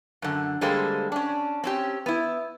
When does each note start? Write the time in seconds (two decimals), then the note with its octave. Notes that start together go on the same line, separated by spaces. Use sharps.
0.22 F#2 D3
0.61 D3 G3 G#3 A#3 A4 C5
1.12 C#4 D4
1.64 C4 C#4 G4
2.06 B3 E4